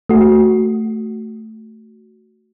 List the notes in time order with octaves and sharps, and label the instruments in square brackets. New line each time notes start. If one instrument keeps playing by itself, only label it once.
[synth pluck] A3 F#4